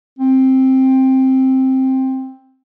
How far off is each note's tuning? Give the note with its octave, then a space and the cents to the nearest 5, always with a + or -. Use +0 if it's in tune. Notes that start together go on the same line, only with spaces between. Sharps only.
C4 +10